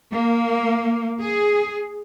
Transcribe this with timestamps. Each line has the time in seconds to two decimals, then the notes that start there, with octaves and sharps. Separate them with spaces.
0.11 A#3
1.20 G#4